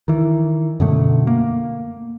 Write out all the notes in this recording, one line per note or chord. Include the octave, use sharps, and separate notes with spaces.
D#3 E3
F#2 B2 D3 A3
A#3